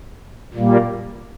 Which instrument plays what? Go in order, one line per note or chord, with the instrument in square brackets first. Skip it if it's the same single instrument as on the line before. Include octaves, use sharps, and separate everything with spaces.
[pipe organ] A#2 G3 A#3